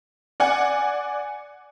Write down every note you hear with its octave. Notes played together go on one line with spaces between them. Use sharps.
D5 F#5 G#5